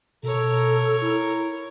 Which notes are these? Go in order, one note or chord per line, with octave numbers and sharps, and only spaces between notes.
B2 A4 A#4 C#5
E4